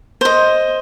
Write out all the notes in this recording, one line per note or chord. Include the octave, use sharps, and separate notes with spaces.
C5 D#5